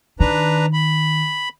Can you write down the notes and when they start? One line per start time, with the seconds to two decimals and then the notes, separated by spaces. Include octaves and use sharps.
0.20 D#3 D4 B4 A#5
0.73 B5